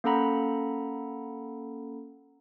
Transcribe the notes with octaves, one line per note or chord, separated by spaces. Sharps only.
A#3 C#4 A4 F#5 A#5 B5